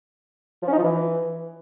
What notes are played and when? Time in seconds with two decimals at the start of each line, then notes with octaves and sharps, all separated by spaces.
0.63 F3
0.68 C#4
0.73 D#4
0.78 F3
0.83 E3